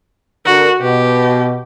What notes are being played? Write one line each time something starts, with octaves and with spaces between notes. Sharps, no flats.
D3 F#4 A#4
B2 G4